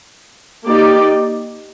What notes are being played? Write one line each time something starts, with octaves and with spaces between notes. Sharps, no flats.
A#3 D#4 G4 D5